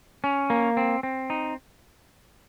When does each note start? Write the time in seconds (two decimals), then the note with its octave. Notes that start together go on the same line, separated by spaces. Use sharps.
0.24 C#4
0.50 A#3
0.77 C4
1.03 C4
1.30 D#4